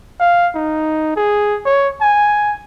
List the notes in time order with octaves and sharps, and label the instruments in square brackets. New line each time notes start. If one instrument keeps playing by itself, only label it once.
[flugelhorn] F5
D#4
G#4
C#5
G#5